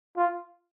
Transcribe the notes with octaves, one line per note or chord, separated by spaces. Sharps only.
F4